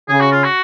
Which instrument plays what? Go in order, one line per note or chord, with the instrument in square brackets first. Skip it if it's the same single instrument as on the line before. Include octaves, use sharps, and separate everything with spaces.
[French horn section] C#3 [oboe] G#4
[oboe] F#4
F4
F#4